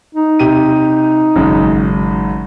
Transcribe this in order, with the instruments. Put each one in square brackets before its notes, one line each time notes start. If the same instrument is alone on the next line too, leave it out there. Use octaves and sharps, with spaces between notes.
[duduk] D#4
[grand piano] C3 G4 D#7
G#1 F#2 C#3